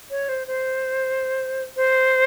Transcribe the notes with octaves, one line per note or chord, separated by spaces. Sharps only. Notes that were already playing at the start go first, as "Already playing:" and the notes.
C#5
C5
C5
C5